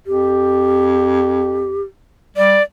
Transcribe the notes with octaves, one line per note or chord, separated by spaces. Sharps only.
F2 G4
G3 D5